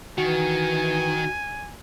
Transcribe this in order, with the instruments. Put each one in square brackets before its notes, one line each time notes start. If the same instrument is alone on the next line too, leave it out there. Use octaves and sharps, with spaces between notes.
[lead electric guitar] D#3 [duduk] E3 [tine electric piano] F#4 [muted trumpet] G#5